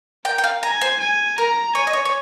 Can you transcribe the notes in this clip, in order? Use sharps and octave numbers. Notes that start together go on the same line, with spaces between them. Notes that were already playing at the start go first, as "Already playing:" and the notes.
A#4 G5
G5
F5
G#5 A#5
C5
G#5
A#4 A#5
C#5 G#5
D#5
C#5
C#5